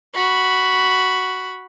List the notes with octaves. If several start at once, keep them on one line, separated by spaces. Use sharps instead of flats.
F#4 B5